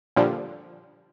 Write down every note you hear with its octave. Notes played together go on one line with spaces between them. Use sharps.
A#2 D3 F3 G3